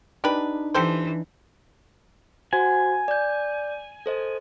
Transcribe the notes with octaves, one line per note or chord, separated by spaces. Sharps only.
D4 D#4 G4 B4
E3 G4 A4 C5
F#4 C5 F#5 G#5
D5 G6
A4 C5 D#5